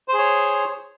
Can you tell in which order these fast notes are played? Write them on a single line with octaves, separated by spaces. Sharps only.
C5 G#4 C#5